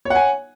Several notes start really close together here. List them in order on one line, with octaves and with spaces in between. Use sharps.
C#5 F#5 G#5